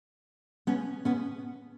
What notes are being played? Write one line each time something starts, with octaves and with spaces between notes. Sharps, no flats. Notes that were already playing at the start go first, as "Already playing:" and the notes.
B3 C#4
B3 C#4